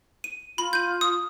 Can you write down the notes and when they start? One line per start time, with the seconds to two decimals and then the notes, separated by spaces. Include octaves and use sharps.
0.24 D#7
0.58 F4 B5 F#7
0.73 G6 D#7
1.01 D#6